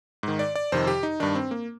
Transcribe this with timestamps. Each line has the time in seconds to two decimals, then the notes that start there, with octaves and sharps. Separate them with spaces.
0.23 G#2 D#3
0.39 D5
0.55 D5
0.72 F2 C3 D#3 C5
0.87 G4
1.03 D#4
1.20 G2 D#3 D4
1.35 C4
1.51 A#3